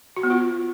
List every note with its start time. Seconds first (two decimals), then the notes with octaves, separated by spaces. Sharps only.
0.16 F#4
0.23 B3
0.30 F4